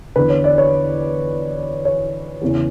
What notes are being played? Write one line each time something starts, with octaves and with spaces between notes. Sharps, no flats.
E2 D3 B4
C#5
D5
C#5
C#5
E2 C#3 E3